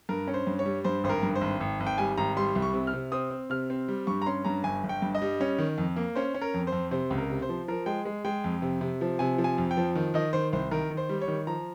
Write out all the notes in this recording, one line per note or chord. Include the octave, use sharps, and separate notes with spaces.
G2 A#4
C#4
C5
G2
C#5
G3
G2 C5
G#1 C5
A#4
G2
C5
G#1
G#1
G#1
G5
G3 G#5
G#1 A#5
G3 C6
C2
C#6
C3
F6
C3
C4 D#6
C4
C3 F6
C4
G3
G2 C#6
A#5
C#4 C6
G2 A#5
G1 G#5
G1
G5
G2
D#5
G3
C#4
D#3
F2
A#3
C#4 C5
C#4
A#4
F2
C5
F2
C3 C5
C#2
A#4
C3
C5
F3
F3 A#4
G#3 G5
G#3
G#3 G5
F2
C3
C3
F3
C3 G#5
F3
G#5
F2
G5
F3
D#3
D#3 D#5
D#3 C5
C2 C5
D#3 A#4
D#3
C5
G3
C#5
D#3
F3 A#5